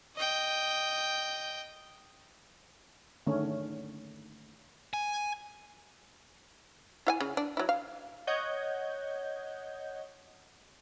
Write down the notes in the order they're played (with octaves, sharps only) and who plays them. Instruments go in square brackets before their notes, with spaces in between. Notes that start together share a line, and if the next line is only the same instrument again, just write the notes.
[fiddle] D#5 G5
[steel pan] D3 D#3 A3 C#4
[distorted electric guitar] G#5
[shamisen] E4 F5 G#5
C#3
D4
F#3 E4
F5
[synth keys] C#5 D#5 F#5 G6 G#6